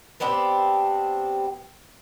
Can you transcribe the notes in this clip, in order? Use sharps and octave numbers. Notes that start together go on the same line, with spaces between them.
B3 C4 D4 G4